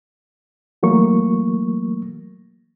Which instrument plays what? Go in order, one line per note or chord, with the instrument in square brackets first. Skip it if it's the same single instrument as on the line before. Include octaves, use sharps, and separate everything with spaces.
[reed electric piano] E3 F#3 A3 A#3 C#6